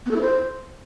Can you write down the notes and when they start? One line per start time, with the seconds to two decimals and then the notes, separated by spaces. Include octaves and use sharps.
0.06 B3
0.11 A4
0.16 E4
0.21 C5